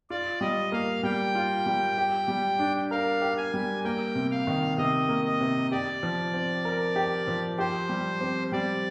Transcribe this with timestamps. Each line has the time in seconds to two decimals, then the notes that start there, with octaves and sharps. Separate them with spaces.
0.10 F4 D5
0.41 G3 D#5
0.72 A#3 F5
1.03 G3 G5
1.35 F4
1.66 G3
1.98 G4
2.28 G3
2.59 D4
2.91 A#4 F5
3.22 G4
3.38 G#5
3.54 G3
3.85 A#3 G5
4.15 C3
4.31 F5
4.47 D#3
4.77 C3 D#5
5.09 A#3
5.25 D#5
5.40 C3
5.71 G4 D5
6.03 F3
6.34 C4
6.65 A#4
6.96 G4
7.28 F3
7.58 G4 C5
7.89 G3
8.21 C4
8.52 G3 D5